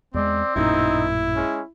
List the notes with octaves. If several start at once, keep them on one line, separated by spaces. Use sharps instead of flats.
E2 G3 G#3 C4 D5
A1 F#2 A#2 D#4 E4
G#3 C#4